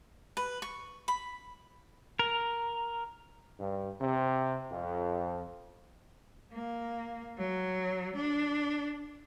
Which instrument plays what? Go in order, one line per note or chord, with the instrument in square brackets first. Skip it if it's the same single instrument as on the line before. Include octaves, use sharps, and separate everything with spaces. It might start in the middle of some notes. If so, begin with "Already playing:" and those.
[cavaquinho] B4
C#6
B5
[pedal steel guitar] A#4
[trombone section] G2
C3
F2
[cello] A#3
F#3
D4